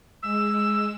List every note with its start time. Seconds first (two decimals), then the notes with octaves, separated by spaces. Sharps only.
0.23 G#3 E6